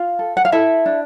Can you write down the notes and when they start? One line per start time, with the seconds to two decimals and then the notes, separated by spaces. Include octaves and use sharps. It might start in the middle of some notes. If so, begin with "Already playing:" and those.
Already playing: F4 F5
0.19 A4
0.37 F#5
0.45 F5
0.52 E4 A4 E5
0.86 D4